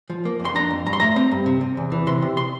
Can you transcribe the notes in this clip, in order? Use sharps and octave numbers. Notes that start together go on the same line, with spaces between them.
F3
A#3
F2
C6
D4 A#5
F2
G2 A#5
C6
A3 A#5
C4 A#5
G2
C3
C3
E2
E3
C3 C6
C3
C6